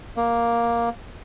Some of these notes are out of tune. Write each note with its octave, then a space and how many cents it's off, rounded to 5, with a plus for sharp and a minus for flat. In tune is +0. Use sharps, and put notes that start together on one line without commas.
A#3 +5